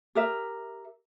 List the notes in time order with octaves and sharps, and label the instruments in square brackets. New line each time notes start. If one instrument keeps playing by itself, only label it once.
[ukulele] G4 A#4 E5